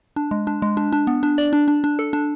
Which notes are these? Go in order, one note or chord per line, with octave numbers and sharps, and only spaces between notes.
D4
G#3
D4
G#3
D4
D4
B3
D4
D5
D4
D4
D4
A4
D4